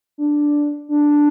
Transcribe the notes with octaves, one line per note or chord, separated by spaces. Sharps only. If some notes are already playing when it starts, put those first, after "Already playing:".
D4
D4